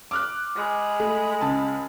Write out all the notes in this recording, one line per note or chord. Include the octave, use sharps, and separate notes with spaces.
D6 F6 F#6
G#3 B5
A3
C#2 A5